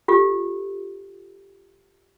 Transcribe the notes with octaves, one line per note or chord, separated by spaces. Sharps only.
F4 G4 A4